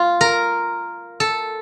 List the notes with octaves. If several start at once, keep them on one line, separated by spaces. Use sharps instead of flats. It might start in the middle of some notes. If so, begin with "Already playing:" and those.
Already playing: F4
A#4
A4